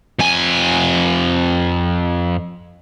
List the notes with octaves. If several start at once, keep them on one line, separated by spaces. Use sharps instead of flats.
F2 G#5